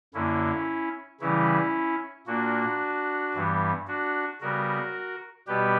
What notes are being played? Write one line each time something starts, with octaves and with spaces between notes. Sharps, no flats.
F#2 D3 A#3 C#4 E4
C#3 E3 G3 C#4 E4
A#2 A#3 D4 F#4
G2 E3 G3 B3
D4 F#4
C#3 G3 B3 F#4 A#4
B2 G3 B3 G4 B4